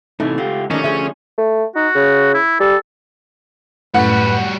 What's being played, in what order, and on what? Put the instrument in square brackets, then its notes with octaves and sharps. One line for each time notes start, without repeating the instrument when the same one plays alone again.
[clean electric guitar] A2 C3 E3 [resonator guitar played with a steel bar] A3 [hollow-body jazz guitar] D#4
[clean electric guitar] C#2 F4 G4 [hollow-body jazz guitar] F#5
[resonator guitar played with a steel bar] D#3 D4 [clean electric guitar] F3 A3 [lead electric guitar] C#4
[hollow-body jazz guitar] D3 [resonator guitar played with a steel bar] G#4 C5 E5
[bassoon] A3
[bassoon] D#4 [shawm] F#4
[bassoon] C#3
[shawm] E4
[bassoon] G3 [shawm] A4
[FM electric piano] F#2 A2 [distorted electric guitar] G3 F#4 [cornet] B4 [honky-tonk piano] F#5